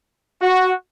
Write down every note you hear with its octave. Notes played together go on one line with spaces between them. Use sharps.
F#4